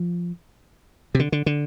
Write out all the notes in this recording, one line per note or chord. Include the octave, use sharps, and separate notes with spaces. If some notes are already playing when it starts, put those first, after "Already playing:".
Already playing: F3
C3
D3
D3
D3